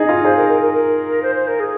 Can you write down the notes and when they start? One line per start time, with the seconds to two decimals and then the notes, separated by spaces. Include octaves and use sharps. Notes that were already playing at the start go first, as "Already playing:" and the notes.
Already playing: D#4 G#4 D#5
0.09 F4
0.24 G#4 C5
0.37 A#4
0.49 A#4
0.62 A#4
0.74 A#4
1.23 C5
1.35 C5
1.48 A#4
1.60 G#4